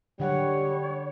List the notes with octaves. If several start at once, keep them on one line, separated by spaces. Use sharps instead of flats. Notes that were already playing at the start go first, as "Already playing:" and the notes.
D3 F#3 G3 C#5 F#5